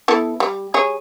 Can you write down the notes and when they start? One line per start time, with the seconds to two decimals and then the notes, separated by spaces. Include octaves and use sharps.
0.08 B3 E4 A4
0.40 G3
0.74 G3 G#4 C#5